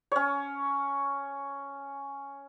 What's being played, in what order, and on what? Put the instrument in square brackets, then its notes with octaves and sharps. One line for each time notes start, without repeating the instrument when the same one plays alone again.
[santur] C#4 C#5